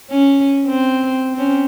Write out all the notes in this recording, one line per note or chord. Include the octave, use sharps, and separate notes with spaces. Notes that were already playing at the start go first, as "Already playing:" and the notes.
C#4
C4
C4 C#4